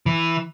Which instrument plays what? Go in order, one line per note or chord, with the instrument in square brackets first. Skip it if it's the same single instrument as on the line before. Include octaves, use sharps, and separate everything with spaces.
[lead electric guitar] E3